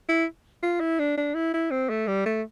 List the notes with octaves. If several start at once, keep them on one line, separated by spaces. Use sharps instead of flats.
E4
F4
E4
D4
D4
E4
E4
C4
A3
G3
A3